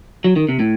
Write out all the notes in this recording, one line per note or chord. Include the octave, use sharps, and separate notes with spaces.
F#3
D#3
C3
A2